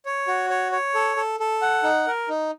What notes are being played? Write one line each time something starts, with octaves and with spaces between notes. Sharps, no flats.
C#5
F#4
C#5
C#5
A4
A4
A4
F#5
D#4
A#4
D#4